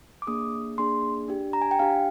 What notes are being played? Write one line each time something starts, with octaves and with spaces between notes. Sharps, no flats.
D6
A#3 D4 G#4 D#6
A#3 D4 G#4 C6
D4 G4
A#5
G#5
G5
D4 G4 F5